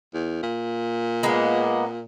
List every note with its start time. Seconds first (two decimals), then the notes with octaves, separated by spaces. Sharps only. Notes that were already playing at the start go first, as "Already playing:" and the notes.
0.14 E2
0.43 A#2
1.23 G#3 A#3 B3